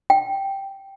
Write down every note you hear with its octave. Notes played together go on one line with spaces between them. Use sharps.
G5